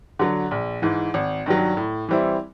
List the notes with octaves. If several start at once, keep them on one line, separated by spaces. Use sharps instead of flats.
D3 F#3
A#1
G#2 E3
G#1
G2 D#3 F#3
A2
E3 G3 C4 E4